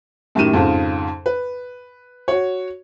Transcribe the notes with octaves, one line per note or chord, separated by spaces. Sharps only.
F#2 A2 D#3 G4 D#7 E7
F2 G#2 C#3
B4
F#4 C#5